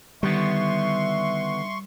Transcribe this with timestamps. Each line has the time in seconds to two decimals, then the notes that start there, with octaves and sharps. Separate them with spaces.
0.23 D3 D#3 G3 B3 E5 C6 C#6